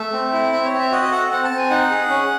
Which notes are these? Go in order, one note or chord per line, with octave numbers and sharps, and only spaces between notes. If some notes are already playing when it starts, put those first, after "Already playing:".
Already playing: A3 E5
C4
E4
C4 E5
C#5
C4
E5
F#4 D#5
D#5
A4 F#5
C4 F#5
A5
C4
G#5
D#4 F#5
G#4
C#4